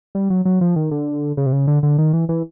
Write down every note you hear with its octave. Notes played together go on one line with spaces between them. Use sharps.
G3
F#3
F#3
F3
D#3
D3
C#3
C3
C#3
D3
D3
D#3
E3
E3